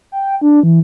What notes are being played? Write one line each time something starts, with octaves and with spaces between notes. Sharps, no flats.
G5
D4
E3